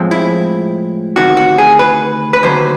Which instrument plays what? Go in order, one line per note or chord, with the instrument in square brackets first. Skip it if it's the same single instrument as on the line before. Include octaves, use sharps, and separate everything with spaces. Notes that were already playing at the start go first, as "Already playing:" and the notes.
Already playing: [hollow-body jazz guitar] A2 F3 G#3 C4
E4
D2 C3 D#3 F#4
F#4
G#4
B4
B4
D#2 D3 F#3 C5